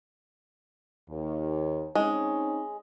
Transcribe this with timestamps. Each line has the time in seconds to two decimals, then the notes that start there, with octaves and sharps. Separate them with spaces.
1.09 D#2
1.95 G#3 C4 C#4 D#4